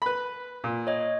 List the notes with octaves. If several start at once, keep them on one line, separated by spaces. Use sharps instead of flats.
B4 B5
A#2
C#5 D#5